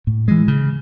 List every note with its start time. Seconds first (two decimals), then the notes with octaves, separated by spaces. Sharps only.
0.07 A2
0.28 E3 G#3
0.48 C#3